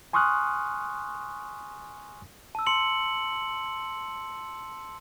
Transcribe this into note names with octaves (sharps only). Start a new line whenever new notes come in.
G#5 C6 C#6 D#6 F6 F#6
A5 E6
C6 C#7 F#7